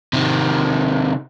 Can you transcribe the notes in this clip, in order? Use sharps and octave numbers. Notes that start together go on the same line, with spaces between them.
C3 D#3